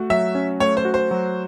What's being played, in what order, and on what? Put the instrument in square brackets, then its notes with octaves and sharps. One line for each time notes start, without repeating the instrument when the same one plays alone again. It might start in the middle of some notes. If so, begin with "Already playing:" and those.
Already playing: [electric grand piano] A3 F#4
[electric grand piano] F#3 [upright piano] E5
[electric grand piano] C#4
[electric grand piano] A3 [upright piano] C#5
[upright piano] C5
[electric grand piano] F#4
[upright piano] C5
[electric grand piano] F#3